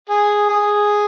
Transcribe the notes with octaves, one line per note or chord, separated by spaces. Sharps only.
G#4
G#4